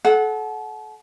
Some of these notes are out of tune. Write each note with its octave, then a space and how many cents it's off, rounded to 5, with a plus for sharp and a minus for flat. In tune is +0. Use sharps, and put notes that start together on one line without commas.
A4 -35 F#5 +0